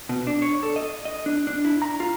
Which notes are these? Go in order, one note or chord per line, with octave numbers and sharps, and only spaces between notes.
B2
D4
C#5
A4
D#5
D#5
D4
D4
E4
A#5
F4